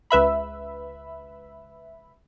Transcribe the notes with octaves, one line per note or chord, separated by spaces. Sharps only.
C#2 B4 E5 B5